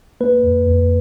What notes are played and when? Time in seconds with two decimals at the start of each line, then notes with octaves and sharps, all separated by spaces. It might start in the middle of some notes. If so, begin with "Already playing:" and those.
0.21 A#3 B4
0.43 F2
0.66 F2